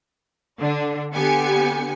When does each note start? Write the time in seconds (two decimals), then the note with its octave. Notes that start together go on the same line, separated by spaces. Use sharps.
0.59 D3 D4
1.12 D3 B3 G4 G#5 C#7